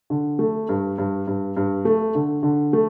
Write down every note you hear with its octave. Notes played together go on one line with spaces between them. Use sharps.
D3
A3
G2
G2
G2
G2
A3
D3
D3
A3